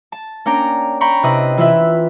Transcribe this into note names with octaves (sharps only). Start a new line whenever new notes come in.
A5
A#3 C#4 D4 G5 A#5
G5 A#5 B5 C#6
C3 E4 B4 D#5
E3 E4 F4 B4 E5